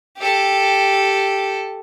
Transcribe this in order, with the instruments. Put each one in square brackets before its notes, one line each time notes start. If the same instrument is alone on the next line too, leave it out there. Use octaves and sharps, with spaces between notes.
[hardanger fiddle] G4 A4